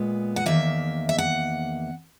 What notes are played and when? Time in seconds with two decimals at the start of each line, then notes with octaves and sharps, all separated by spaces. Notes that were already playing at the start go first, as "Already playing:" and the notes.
Already playing: A#2 G#3 B3
0.36 F#5
0.46 E2 D#3 A#3 E5
1.09 E5
1.18 F#5